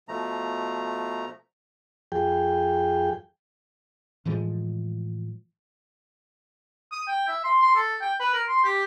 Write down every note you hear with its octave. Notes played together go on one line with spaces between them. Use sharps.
B2 F3 A3 A#5
F2 G#4 G5
A2 E3 F3 G#3
D#6
G5
E5
C6
C6
A4
G5
B4
A#4
C6
G4